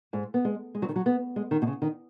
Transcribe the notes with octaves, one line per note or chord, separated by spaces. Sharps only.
G#2
B3
G#3
G#3
F#3
D#3
F#3
B3
G#3
D#3
B2
C#3
D#3